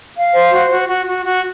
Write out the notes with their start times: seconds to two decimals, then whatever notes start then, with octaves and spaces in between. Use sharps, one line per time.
0.16 F5
0.34 C5
0.52 F#4
0.70 F#4
0.88 F#4
1.07 F#4
1.26 F#4